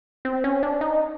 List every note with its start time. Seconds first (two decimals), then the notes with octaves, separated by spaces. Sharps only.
0.25 C4
0.44 C#4
0.63 D4
0.81 D#4